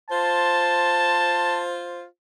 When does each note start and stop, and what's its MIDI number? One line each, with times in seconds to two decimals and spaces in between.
0.11 2.02 65
0.11 2.02 72
0.11 1.63 81